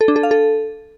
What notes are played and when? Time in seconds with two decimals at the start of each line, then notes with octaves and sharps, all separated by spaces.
0.01 A4
0.08 D4
0.16 A4
0.23 F5
0.31 A4